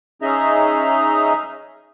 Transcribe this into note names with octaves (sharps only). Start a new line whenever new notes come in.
C#4 D#4 G#4 D#5 E5 A#5